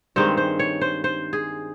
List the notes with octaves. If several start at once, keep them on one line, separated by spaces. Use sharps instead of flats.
G2 D#3 G#3 C4 C5
C5
C#5
C5
C5
G#4